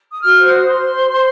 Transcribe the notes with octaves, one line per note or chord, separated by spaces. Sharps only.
D#6
F#4 F6
C5
D#6
C5
C6
C5
C5
C5